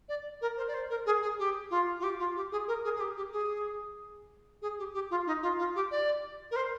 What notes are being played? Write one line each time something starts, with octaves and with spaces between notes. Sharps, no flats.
D5
A#4
C5
D5
C5
A#4
G#4
G#4
G4
F4
F4
G4
F4
G4
G#4
A#4
G#4
G#4
G4
G4
G#4
G#4
G4
G4
F4
D#4
F4
F4
G4
D5
A#4
C5